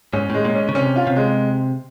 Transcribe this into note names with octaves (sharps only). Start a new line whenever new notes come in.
G#2 C#4
A2 G#3
A#2
C#4
C#3
C3 C#4
F4
C3
G#3